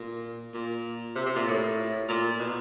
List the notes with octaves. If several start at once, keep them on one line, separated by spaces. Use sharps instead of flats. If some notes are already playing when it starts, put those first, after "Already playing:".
Already playing: A#2
A#2
C3
C3
A#2
A2
A#2
B2